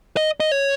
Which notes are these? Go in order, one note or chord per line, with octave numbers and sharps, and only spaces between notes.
D#5
D#5
C#5